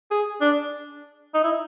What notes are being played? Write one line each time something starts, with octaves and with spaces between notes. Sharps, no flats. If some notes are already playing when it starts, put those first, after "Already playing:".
G#4
D4
D#4
E4